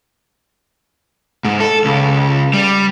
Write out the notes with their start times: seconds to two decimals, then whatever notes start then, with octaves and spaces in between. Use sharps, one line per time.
1.45 G#2
1.60 A4
1.85 C#2
2.54 G3